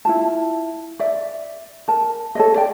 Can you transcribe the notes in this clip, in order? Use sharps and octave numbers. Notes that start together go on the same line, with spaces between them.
E4 F4 A5
D5 E5
A#4 A5
A4 C#5 D#5
D5 G5